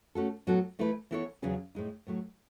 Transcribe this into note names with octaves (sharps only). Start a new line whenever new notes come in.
A3 C#4 F#4 A4
A2 F#3 B3 F#4 A4
E3 A3 E4 B4
E3 B3 E4 A4 C#5
E2 C#3 F#3 C#4 G#4
A2 G#3 D#4
A2 F#3 A3